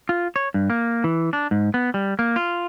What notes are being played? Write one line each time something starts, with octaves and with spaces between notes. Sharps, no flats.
F4
C#5
G2
A#3
E3
D4
G#2
B3
G3
A#3
F4